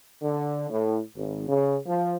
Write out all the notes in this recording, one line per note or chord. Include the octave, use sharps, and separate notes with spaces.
D3
A2
G#1
C#3
F3